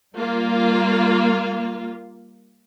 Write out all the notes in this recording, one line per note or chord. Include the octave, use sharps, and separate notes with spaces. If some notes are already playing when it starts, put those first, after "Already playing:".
G3 A#3 F4